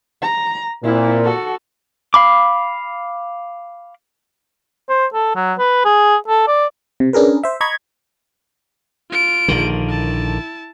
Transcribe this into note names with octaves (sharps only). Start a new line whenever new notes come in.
A#5
A#2 C4 E4
F#4 A4
F5 B5 D6
C5
A4
F#3
B4
G#4
A4
D5
C3
C#4 D4 G#4 A#4 B4
C5 E5
D#5 A#5 B5 C#6 G#6
F4 D7
A#1 D3 D#3
E4 A5